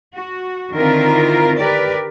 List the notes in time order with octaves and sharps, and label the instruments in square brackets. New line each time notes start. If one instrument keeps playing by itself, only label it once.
[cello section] F#4
D3 D#3 C4 E4 F4 A#4
G4 A#4 B4 D5